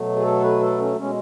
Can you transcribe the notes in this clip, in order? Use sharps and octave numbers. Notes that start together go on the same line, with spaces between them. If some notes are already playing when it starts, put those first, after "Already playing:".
Already playing: B2 F#3 A3
G#4
A4
B4
A4
C#4
B2 G#3 C#4